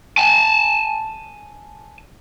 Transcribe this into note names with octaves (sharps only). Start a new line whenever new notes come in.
G#5 A5